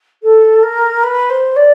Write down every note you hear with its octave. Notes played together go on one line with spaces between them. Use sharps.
A4
A#4
B4
C5
D5